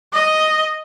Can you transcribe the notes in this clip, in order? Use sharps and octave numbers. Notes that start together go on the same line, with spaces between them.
D#5